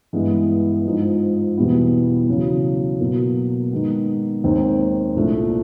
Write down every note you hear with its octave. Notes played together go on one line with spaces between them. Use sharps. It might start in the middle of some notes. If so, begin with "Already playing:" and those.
G2 E3 G#3 B3
G#2 F3 G#3
E2 B2 G3 B3 E4
E2 C#3 F#3
B2 F#3 A#3
D#3 G#3 B3
D#2 D#3 G#3 C4
C2 A#2 F3 A3 D4